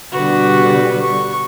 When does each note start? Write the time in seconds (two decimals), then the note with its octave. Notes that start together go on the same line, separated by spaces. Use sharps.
0.12 B2 D3 G3 F#4 B4
1.00 C#6